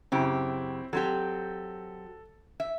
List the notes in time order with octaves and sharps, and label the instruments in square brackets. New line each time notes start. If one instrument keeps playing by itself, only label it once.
[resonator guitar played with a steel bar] F#2 C#3 G4 [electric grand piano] C4 E4 G5
[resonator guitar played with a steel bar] F#3 C4 G4 [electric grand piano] A4
[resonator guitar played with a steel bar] E5